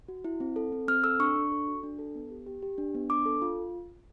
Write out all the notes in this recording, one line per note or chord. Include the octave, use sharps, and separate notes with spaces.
F#4
E4
C4
A4
C4
C4 F6
A4 E6
D4 C#6
D4
A4
F#4
D4
A4
B3
G4
G4
G4
D4
B3
D4 D6
A4
F4